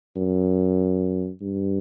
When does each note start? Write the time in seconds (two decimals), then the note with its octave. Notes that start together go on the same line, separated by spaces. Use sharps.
0.16 F#2
1.41 G2